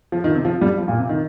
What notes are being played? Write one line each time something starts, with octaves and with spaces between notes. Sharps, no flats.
F3
D#3
C3
F3
G3
F3
A#2
C3
D#3